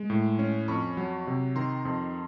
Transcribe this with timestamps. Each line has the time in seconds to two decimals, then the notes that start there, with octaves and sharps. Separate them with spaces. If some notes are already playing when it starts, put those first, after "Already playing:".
Already playing: G#3
0.10 A2
0.39 C#4
0.68 F2 B5 C#6
0.97 F#3
1.27 C3
1.56 D#3 A#5 C6
1.85 F2